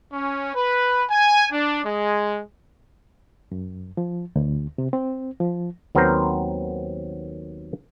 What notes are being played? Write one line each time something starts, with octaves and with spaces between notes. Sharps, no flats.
C#4
B4
G#5
D4
G#3
F#2
F3
D2
C3
C4
F3
D#2 F#3 B3 C4 A#4 C5